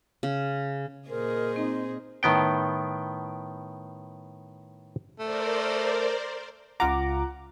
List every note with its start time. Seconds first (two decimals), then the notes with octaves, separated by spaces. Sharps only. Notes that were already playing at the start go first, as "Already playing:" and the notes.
0.23 C#3
1.09 A#2 G#4 A#4 C5 D#5
1.56 C4 D#4
2.23 A2 D#3 B3 G5
5.20 A3 A#4 C5 D5
6.80 C#2 F4 F#5 A#5 D6